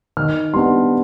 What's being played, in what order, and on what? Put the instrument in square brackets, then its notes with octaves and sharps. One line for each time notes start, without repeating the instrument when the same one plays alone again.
[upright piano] D#3 F6
G3 B3 D4 C6